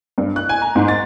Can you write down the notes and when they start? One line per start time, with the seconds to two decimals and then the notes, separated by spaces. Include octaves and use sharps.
0.18 G2
0.36 F#6
0.49 G#5
0.62 A#5
0.75 G#2
0.88 A6